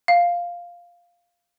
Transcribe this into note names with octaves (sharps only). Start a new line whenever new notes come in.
F5